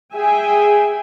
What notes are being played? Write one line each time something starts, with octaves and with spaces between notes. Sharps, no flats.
G#4 E5 G5 G#5